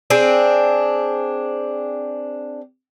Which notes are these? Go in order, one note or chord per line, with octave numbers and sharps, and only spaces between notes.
C4 D4 G#4